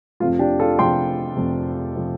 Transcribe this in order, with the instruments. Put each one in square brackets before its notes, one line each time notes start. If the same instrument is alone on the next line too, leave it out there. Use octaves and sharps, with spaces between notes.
[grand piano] F1 F2 C3 F3 A3 [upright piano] F4
[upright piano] D4 G4
F4 A4
[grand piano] F1 F2 C3 F3 A3 [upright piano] G5 C6
[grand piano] F1 F2 C3 F3 A3
C3 F3 A3